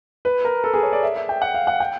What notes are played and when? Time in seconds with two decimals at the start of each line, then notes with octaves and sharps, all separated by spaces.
0.25 B4
0.45 A#4
0.64 A4
0.74 G#4
0.83 C#5
0.93 D5
1.03 E5
1.16 E5
1.29 G5
1.42 F#5
1.54 F5
1.67 F#5
1.80 G5